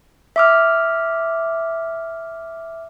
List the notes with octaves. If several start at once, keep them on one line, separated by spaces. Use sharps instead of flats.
E5 D6 F6